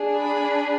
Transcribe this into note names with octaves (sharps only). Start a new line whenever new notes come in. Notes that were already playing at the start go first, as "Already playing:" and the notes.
Already playing: D4 G#4
B5